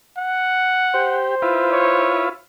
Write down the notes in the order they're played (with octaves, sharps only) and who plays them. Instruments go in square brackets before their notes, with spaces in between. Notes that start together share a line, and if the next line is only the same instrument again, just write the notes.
[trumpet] F#5
[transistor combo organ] G4 [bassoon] C5
[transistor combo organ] E4 F4 B4
[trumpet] C#5